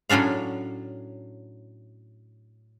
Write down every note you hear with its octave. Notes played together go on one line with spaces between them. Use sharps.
A2 F#3 C#4 D4 F5